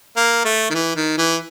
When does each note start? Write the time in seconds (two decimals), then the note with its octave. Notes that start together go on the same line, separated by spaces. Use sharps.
0.16 A#3
0.45 A3
0.70 D#3
0.74 E3
0.96 D#3
1.18 E3